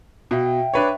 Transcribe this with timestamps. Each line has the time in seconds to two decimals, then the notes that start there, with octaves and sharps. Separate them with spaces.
0.31 B2 E5 F5 G5
0.74 D4 B4 C#5